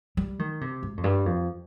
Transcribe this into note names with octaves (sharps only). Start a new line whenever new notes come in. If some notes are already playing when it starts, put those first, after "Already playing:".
G3
D#3
C3
G#2
F2
G2
F2